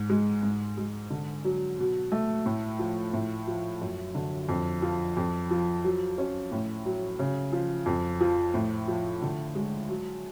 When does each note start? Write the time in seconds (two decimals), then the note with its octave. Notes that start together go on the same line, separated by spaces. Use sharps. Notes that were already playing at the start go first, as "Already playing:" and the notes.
Already playing: G#2
0.10 G#3
0.43 G#2
0.77 G#3
1.10 D3
1.45 F#3
1.79 B2
2.12 A3
2.46 A2
2.79 F3
3.13 A2
3.47 F3
3.81 F#2
4.15 D3
4.49 F2
4.82 F3
5.17 F2
5.51 F3
5.84 F#3
6.18 C#4
6.52 A2
6.86 F#3
7.19 C#3
7.52 F3
7.86 F2
8.21 F3
8.54 A2
8.88 F3
9.22 D3
9.55 G#3
9.89 F#3